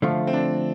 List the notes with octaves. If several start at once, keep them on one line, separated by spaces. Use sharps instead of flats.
D3 F3 A3 F4
C4
D4